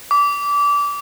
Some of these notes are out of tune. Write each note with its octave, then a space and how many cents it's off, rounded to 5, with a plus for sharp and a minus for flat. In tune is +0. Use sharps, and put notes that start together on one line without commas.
D6 -25